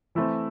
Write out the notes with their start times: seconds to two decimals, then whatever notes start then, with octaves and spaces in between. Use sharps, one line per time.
0.15 E3 A3 C4 E4